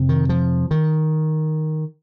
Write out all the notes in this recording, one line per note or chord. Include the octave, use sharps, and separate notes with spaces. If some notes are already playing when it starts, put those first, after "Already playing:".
Already playing: F2 C3
D#3
F3
D#3